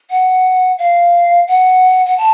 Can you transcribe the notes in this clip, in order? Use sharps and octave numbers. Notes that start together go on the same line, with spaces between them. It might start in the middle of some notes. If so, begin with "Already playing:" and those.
F#5
F5
F#5
F#5
A5